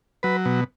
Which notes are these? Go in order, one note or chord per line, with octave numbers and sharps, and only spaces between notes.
F#3 B4
B2